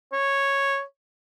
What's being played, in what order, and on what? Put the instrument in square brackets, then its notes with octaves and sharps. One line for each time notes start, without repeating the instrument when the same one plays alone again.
[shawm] C#5